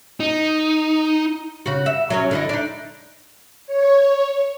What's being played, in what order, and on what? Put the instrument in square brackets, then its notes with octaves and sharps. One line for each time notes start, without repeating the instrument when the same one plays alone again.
[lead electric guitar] D#4
[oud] C#3 F#4
E5
F#3 C#4 C#5
D3 E4 D#5
D4 D#4
[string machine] C#5